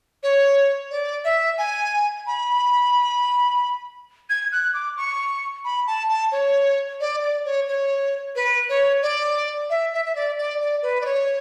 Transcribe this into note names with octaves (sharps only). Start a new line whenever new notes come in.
C#5
D5
E5
G#5
B5
G#6
F#6
D6
C#6
B5
A5
A5
C#5
D5
D5
C#5
C#5
B4
C#5
D5
E5
E5
E5
D5
D5
D5
B4
D5
C#5